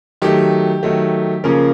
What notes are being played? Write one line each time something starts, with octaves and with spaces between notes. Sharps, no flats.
D#3 F#3 A3 G4
D#3 F#3 A3
C#3 F3 A#3 C#4 A#4